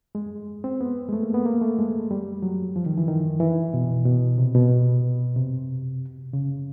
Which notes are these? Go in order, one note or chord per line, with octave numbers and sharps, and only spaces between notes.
G#3
C4
B3
G#3
A3
A#3
B3
A#3
A3
G#3
G3
F#3
F3
D#3
E3
D#3
E3
B2
B2
C3
B2
C3
C#3